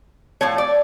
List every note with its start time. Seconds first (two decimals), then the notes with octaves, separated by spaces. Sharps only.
0.41 A2 F3 A3 C#5
0.58 D5